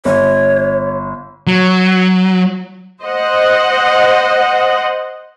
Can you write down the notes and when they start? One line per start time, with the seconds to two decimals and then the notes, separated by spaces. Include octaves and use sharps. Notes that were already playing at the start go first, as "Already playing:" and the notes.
0.05 G1 C#5
1.47 F#3
3.03 C5 D#5 F#5